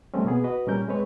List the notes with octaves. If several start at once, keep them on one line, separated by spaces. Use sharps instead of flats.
F3 G3 A3 C4 C#4
B2 A#3 B3 G#4
F#4 B4 D#5
A#2 G3 C#4 G4 A#4 G6
G#3 C4 B4 C#5